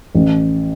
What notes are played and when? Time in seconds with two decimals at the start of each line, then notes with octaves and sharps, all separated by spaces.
0.15 A1